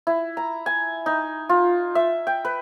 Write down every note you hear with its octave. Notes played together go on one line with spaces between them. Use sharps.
E4
A#5
G#5
D#4
F4
E5
G5
B4